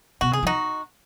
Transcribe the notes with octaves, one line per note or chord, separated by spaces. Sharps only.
B2 F#4
C#3 G#4
F3
D#4 F#4